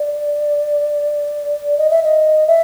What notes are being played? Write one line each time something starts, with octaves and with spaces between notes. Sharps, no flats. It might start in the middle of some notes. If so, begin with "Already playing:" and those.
Already playing: D5
D#5
E5
D#5
E5